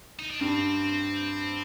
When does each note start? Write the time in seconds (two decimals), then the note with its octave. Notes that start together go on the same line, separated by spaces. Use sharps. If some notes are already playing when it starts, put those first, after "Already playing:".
0.19 D#4
0.30 D4
0.41 G2 C4